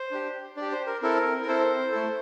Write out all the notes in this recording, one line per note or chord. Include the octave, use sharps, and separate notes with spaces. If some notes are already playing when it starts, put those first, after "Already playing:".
Already playing: C5
D4 G4
D4 G4 D5
C5
A#4
C4 E4 A4 A#4
A#4
C4 E4 A4 C5
A3 E4 A4